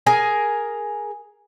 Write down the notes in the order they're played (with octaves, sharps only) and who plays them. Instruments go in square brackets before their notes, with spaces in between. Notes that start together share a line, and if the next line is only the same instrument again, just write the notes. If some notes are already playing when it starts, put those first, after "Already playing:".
[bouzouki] G#4 A#4 G#5